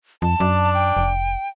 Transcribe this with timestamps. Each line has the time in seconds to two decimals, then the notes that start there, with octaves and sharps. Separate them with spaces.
0.22 F2 A5
0.40 F#2 D4
0.74 G5
0.97 F1